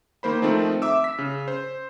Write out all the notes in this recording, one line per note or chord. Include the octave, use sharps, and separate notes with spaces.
D#3 A#3 C5 B5
D#3 F3 A3 C4 D#4
E5 D6 E6
B6
C#3
C5